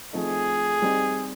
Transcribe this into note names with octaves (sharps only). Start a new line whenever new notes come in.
F3 A3 C4 D#4 G#4
G3 C4 D#4